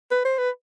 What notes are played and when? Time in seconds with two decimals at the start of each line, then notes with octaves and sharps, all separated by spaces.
0.11 B4
0.25 C5
0.38 B4